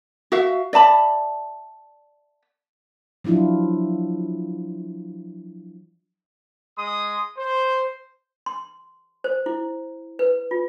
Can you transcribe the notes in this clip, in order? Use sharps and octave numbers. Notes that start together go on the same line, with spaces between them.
F#4 E5 F5
D5 E5 A5 B5
F3 F#3 D4 E4 F4
G#3 C6 D#6
C5
C6
C5
E4
B4
F4